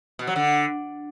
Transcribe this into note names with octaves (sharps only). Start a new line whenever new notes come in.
B2
F#3
D3